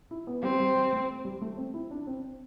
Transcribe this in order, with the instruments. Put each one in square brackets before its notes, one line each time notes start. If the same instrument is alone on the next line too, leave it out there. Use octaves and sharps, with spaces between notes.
[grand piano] E4
B3
[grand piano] G3 [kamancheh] C4
[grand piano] G3
G3
A3
G3
A3
C4
E4
D4
C4